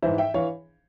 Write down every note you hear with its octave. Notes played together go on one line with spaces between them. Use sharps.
G#2 E3 C5 E5
E5 G5
E3 C#5 F5